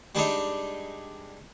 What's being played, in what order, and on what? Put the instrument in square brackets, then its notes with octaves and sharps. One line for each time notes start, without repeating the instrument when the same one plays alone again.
[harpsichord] G3 G#3 D4 D#4